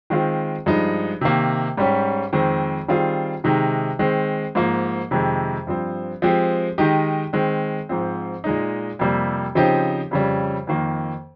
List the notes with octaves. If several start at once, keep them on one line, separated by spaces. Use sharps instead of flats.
D#3 G#3 C4 F4
G2 F3 G#3 D#4
C3 D#3 A#3
G#2 G3 C#4 G4
F2 D#3 G#3 C4
D#3 G3 C4 F4 G#4
C3 D#3 G#3 D#4
D#3 G#3 C4
G#2 F3 A#3
F2 C3 D#3 G#3
G2 F3 C4
F3 G#3 C4 G4
D#3 G#3 D#4 G4
D#3 G#3 C4
G#2 F3 C4
A#2 G#3 D#4
F2 C3 G3 A#3
C#3 F3 C4 D#4 G4
F2 C#3 G3
F2 D#3 A#3